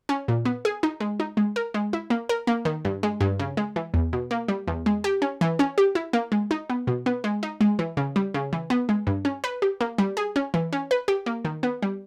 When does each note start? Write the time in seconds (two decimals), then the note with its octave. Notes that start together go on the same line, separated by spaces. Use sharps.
0.09 C#4
0.28 A#2
0.45 B3
0.65 G#4
0.83 D#4
1.00 G#3
1.20 D#4
1.37 G#3
1.56 A#4
1.74 G#3
1.93 E4
2.10 A#3
2.29 A#4
2.47 A#3
2.65 D#3
2.85 G2
3.03 G#3
3.20 G2
3.40 C#3
3.57 G#3
3.76 E3
3.94 E2
4.13 B2
4.31 A#3
4.48 G3
4.67 E2
4.86 G#3
5.04 G4
5.22 C#4
5.41 E3
5.59 C#4
5.78 G4
5.95 E4
6.13 A#3
6.32 G#3
6.51 D#4
6.70 B3
6.87 B2
7.06 B3
7.24 G#3
7.43 D#4
7.61 G#3
7.79 E3
7.97 C#3
8.16 G3
8.34 C#3
8.53 E3
8.70 B3
8.89 G#3
9.07 G2
9.25 C#4
9.44 B4
9.62 G4
9.81 A#3
9.98 G3
10.17 G#4
10.36 C#4
10.54 E3
10.73 C#4
10.91 B4
11.08 G4
11.26 A#3
11.45 D#3
11.63 B3
11.82 G3